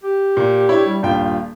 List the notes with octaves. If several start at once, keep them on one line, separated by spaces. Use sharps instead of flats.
G4
A#2
D4 E4 C#5
G3
D#1 G2 F4 G5